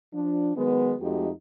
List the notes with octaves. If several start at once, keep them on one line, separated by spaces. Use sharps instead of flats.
F3 D4
D#3 F#3 G#3 B3
F2 G#3 A3 D#4 F#4 G4